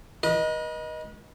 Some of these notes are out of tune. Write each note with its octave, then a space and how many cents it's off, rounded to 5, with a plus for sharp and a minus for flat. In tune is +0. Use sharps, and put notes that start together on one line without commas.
B4 -40 D#5 +0